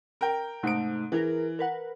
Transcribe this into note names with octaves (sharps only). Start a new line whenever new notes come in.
A#4 G5
G#2 C3 A3 D#4 D7
E3 G#4 A#4
A#4 B4 F#5